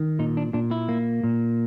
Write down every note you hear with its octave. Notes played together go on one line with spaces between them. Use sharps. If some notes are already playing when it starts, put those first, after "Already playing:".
Already playing: D#3
A#2 D#4
D4
A#2 D4
E4
A#3
A#2